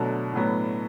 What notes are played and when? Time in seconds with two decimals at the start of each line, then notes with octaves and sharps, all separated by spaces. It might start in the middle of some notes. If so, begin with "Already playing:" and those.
Already playing: B2 D3 F#3 A3
0.33 A2 F#3 B3